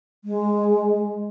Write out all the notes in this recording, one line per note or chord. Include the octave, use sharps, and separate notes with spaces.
G#3